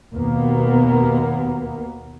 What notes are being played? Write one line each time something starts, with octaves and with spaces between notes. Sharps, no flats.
D#2 B2 A#3 B3